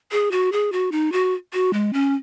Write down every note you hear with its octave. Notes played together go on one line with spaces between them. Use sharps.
G#4
F#4
G#4
F#4
D#4
F#4
F#4
G#3
C#4